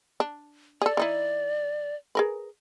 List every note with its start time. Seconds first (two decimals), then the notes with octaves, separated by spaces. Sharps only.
0.20 D4
0.82 G#4 A4 D5
0.97 E3 D#4 E4
2.15 G#4 A#4 B4